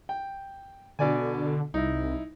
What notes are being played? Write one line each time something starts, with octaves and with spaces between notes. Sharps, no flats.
G5
B2 D3 D5 G#5
C2 D#4 E4